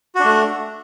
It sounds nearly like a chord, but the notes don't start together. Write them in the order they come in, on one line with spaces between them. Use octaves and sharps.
F#4 D4 A3